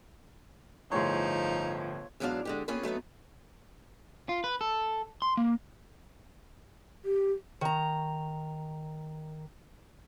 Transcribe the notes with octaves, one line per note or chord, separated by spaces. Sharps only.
G1 A2 F3 D#4 G#4 C#5 C6
E2 G#2 F#3 D4 F5 A5
D3 G#3 G4
A#3 C4 C#4 F4 G#4 B4
F#3 A3 B3 D#4
F4
B4
A4
C6
A#3
G4
D#3 A#5